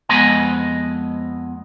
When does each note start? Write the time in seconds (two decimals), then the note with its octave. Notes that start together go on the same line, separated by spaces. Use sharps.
0.09 F2 G#3 B3 D#5 G#5